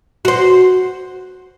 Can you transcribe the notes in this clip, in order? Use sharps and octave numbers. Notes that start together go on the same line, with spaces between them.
F#4 C5